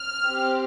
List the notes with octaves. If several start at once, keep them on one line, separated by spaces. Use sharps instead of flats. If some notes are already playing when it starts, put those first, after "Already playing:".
Already playing: F6
C4 G4